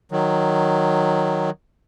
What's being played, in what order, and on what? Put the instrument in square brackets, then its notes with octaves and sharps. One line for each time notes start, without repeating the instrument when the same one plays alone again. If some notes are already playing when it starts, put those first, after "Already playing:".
[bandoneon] D#3 F#3